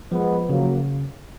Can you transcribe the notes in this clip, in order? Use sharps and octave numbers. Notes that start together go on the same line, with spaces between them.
F3 G#3 B3
C#3 F#3 A#3